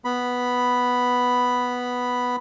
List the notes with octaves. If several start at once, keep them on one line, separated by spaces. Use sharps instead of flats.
B3 B5